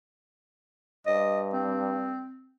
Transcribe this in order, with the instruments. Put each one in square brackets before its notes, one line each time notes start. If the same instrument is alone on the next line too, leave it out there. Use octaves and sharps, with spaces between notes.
[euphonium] G2 [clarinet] D#5
[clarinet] C4